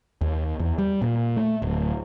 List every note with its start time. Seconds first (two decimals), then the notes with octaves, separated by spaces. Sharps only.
0.21 D#2
0.60 E2
0.78 G3
1.02 A#2
1.37 A3
1.62 D1